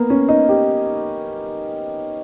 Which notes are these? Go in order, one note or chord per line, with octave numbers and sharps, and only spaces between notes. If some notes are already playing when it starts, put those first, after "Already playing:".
Already playing: A#3 B3
C#4
D#4
G4